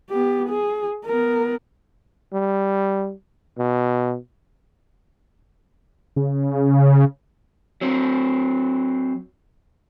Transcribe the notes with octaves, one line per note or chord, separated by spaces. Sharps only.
B3 G4
G#4
B3 A#4
G3
B2
C#3
F#3 C4